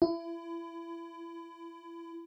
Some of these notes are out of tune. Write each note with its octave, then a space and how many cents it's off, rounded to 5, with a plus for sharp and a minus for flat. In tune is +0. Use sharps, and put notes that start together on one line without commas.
E4 +30